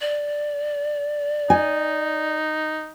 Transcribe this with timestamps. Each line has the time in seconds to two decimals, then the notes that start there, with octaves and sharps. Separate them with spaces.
0.01 D5
1.50 D#4 G#5